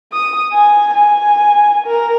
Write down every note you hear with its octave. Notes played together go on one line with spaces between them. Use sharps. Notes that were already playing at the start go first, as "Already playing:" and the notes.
D#6
G#5
G#5
A#4